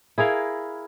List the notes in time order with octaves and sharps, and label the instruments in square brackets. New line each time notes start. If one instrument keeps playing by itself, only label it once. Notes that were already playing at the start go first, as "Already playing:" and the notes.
[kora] E4 G#4 A#4 F5